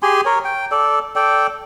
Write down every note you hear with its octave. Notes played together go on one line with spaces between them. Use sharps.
G4 G#4 G#5 C6
A#4 C#5
G5
A4 D5
A4 D5 G5